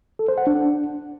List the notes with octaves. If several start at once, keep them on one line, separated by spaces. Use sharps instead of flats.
A4
C5
F#5
D4